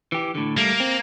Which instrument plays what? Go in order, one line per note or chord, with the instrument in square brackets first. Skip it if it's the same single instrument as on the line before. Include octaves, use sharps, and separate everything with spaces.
[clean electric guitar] E3 G4
A2 D3
[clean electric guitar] G3 A3 [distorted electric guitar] A#3
[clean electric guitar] C4